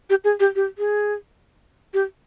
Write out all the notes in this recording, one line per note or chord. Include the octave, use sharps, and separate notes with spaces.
G4
G#4
G4
G4
G#4
G4